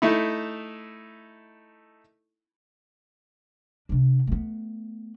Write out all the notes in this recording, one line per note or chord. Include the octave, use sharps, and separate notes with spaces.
A3 D#4 E4
C3 D4
A3 B3